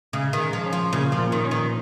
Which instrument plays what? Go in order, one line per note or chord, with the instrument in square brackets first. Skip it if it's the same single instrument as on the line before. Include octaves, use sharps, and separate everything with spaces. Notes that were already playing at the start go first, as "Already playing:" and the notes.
[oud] C#3 [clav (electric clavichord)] G#3
[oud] D#3
[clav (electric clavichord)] G#3
[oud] F3
[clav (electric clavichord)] C#4
[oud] F3
[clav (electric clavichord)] A#2 [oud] C#3
[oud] F3
[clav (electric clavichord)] A#2
[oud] D#3
[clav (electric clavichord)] C#4
[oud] D#3